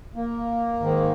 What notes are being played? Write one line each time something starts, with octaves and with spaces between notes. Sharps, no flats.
A#3
G#2 D#3